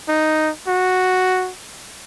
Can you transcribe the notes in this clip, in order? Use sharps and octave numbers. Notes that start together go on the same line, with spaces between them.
D#4
F#4